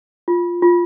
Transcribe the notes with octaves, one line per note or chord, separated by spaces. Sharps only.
F4
F4